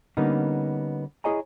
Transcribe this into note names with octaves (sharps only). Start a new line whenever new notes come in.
D3 G3 A#3 B3 C#4 D#4
E4 G#4 C#5 D#5 G#5 A#5